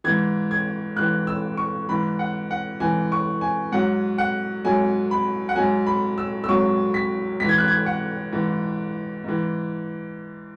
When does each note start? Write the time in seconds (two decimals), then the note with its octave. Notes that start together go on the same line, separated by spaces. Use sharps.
0.04 G#2 E3 G#6
0.51 G#6
0.96 G#2 E3 F#6
1.27 E6
1.57 C#6
1.88 G#2 E3 B5
2.19 F#5
2.51 F#5
2.80 G#2 E3 G#5
3.12 C#6
3.41 G#5
3.72 G#2 F#3 F#5
4.18 F#5
4.65 G#2 F#3 G#5
5.11 B5
5.49 F#5
5.56 G#2 F#3 G#5
5.87 B5
6.18 E6
6.44 E6
6.48 G#2 F#3 C#6
6.94 B6
7.40 G#2 E3 B6
7.49 G#6
7.58 F#6
7.68 G#6
7.86 F#5
8.33 G#2 E3
9.24 G#2 E3